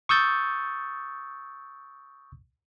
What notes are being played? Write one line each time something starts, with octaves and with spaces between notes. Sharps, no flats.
C#6 D#6 E6 G6 A6